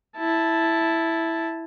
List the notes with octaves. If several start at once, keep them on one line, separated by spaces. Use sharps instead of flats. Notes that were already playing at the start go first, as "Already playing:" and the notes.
E4 A5